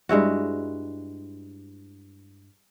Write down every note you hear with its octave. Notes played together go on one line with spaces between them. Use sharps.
G2 G#3 E4 F#4